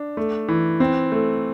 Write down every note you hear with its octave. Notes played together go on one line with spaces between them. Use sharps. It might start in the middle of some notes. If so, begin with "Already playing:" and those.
Already playing: D4
A3
E3
C4
A3